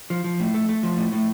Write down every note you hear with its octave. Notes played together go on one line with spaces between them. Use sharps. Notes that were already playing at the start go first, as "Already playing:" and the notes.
F3
F3
A2
A3
A3
F3
A2
A2